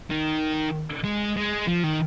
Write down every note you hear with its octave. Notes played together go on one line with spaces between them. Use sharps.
D#3
G#3
G#3
F3
D#3